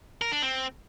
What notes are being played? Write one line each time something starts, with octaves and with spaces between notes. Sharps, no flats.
A#4
D4
C4